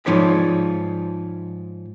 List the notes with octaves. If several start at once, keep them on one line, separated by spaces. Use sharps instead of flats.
G#2 F3 D#4 C#5 D5 B5